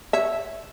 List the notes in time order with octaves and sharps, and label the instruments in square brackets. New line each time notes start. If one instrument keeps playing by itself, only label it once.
[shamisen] C#5 E5